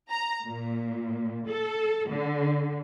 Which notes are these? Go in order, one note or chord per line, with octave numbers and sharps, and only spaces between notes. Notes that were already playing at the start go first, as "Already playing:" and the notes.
A#5
A#2
A4
D3